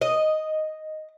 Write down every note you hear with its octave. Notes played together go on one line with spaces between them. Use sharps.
D#5